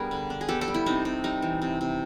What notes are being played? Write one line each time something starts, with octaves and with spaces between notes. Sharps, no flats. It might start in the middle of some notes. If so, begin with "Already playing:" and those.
Already playing: G3 B3 D4 G#4 A#4
D3
D4
G#4
B3 G4 A4
G4 A4
G3
E4
C3 D#4
C3
G3 D#4
E3
C3
C3